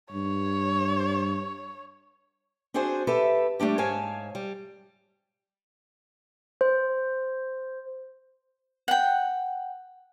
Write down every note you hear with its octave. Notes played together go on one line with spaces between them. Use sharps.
G2 C#5
C4 D4 F#4 G#4 C5 G#5
G4 A4 B4 E5
G3 A3 D4 G4
G#2 C#5 F5 G#5 A5
G3
C5
F#5 G5